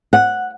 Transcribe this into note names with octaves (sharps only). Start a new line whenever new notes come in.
F#5